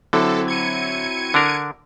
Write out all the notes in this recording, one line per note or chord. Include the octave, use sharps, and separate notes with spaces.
D3 F#3 C4 E4 A4
G#6 C#7 D#7
D3 D4 A#4